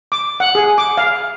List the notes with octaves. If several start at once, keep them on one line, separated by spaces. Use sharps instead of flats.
D6
F#5
G#4
D6
F5